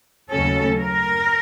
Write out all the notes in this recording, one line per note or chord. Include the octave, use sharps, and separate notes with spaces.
D#2 C#3 F#3 A3 C#4 A4
A#4